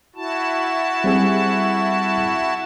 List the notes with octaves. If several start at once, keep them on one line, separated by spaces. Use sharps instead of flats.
E4 F#4 A5
G3 C4 G#4